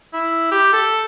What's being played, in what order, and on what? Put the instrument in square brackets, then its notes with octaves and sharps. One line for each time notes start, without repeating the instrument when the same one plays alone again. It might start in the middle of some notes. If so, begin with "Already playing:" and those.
[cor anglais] E4
G4
A4